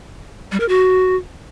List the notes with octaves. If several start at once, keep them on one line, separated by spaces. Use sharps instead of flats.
G3
A#4
F#4